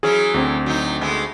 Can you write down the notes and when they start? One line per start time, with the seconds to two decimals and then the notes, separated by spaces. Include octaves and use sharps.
0.03 E3 F#3 C#4 G#4
0.34 D2 C4
0.66 F#3 D#4
1.01 G#3 A3 B3